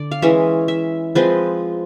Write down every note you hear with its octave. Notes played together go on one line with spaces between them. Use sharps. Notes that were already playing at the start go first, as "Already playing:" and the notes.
Already playing: D3 D5
F5
E3 G#3 C#4 E5
E5
F3 G#3 C4 B4